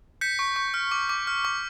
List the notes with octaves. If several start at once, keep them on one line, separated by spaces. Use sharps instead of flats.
G6 B6 C#7
C#6
C#6
F6
D6
D6
F6
D6